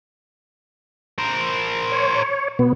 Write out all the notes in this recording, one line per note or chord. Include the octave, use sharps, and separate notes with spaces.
A#4 C5
C#5
B2 B3